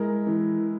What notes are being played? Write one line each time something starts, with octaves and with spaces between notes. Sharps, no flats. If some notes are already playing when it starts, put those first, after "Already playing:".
Already playing: G#3 E4 A#4
E3